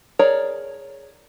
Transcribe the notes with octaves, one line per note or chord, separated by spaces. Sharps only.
G#4 A#4 C#5 D5 A#5